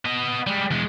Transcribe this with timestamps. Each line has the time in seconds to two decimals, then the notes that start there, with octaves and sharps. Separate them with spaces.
0.05 B3 D#5
0.47 G3 G#3
0.71 E2 G#3